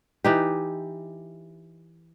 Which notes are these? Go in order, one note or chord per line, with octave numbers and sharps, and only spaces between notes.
E3 D#4 G4